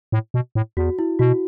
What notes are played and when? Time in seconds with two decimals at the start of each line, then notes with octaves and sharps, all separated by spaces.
0.12 A2
0.34 B2
0.55 A2
0.77 E2 F#4
0.99 E4
1.19 B2 F#4